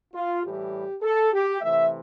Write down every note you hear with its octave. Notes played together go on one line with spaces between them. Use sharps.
F4
A2 E3 G3 G4
A4
G4
C3 E3 A3 E5